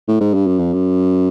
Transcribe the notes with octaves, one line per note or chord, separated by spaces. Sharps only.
A2
G#2
G2
F#2
F2
F#2